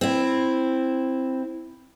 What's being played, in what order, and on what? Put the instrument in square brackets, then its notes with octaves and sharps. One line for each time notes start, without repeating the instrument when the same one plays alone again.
[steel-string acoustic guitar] C4 E4